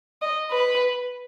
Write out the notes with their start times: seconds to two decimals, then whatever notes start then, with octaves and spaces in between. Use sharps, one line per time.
0.22 D#5
0.51 B4